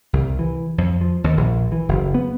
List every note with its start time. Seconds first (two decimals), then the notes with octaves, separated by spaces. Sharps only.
0.13 C2
0.39 E3
0.78 F2
1.01 F3
1.24 D#2
1.37 A#1
1.72 E3
1.89 F#1
2.14 B3